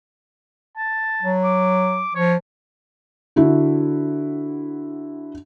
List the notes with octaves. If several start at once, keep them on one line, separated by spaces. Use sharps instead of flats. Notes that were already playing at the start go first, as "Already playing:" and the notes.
A5
F#3
D6
F3 C#5
D3 E4 F#4